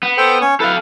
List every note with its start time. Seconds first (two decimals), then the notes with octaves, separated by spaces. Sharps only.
0.03 B3
0.17 A4 C5 G5
0.41 C#4 C#5 C#6
0.60 E4 A4 B4 F5